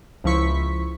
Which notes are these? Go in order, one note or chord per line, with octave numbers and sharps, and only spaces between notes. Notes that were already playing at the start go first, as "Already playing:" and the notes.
C#2 F3 E4 C#6 B6